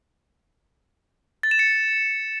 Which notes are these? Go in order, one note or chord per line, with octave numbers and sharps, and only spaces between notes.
A6
E7
C#7